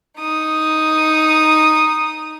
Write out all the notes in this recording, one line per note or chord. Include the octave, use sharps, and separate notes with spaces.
D#4 D#6